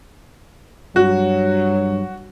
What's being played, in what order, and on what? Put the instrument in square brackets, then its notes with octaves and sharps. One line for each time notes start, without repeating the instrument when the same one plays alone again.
[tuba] G2 [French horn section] F#3 [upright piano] F#4